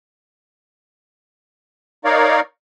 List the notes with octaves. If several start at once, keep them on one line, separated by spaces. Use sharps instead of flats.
D#4 A#4 C#5 D5 F5